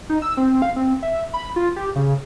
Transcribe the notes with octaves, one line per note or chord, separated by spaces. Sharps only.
D#4
E6
C4
F5
C4
E5
B5
F4
G4
C#3